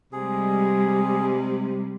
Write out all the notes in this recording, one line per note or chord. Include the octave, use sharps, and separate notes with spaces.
C3 G3 G#3 G#4